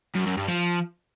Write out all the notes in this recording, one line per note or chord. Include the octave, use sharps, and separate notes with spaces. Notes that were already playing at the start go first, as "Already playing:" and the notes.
F#2
F#2
G2
F3